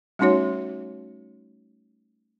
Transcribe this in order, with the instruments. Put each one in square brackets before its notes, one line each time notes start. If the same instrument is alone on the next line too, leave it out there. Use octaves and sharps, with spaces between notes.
[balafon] G3 A3 C#4 D#4 F#4 C#5